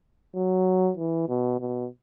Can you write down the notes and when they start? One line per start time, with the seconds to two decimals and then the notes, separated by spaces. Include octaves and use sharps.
0.35 F#3
0.97 E3
1.29 B2
1.60 B2